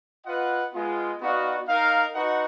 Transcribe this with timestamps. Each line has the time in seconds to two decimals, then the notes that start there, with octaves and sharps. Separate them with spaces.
0.24 F4 B4 D#5 F#5
0.73 G#3 B3 F4
1.19 B3 D#4 F#4 D5 F5
1.67 D#4 A#4 F5
2.14 D#4 F#4 B4 D#5 F#5